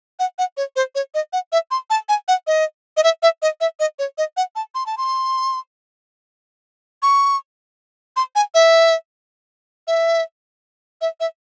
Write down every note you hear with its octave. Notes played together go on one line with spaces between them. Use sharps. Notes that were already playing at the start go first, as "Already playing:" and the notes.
F#5
F#5
C#5
C5
C#5
D#5
F#5
E5
C6
A5
G#5
F#5
D#5
D#5
E5
E5
D#5
E5
D#5
C#5
D#5
F#5
A5
C6
A5
C6
C#6
C6
G#5
E5
E5
E5
E5